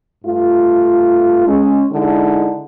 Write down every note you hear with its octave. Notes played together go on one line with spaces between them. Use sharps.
G2 A3 F4
G#3 C#4
D3 G#3 D#4 E4